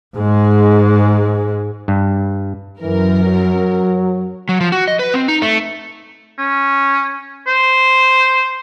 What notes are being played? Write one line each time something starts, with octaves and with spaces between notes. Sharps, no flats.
G#2 G#3
G2
F#2 E3 A#4
F#3
F#3
F3
F#4
D#5
B4
C4
D#4
A3
C#4
C5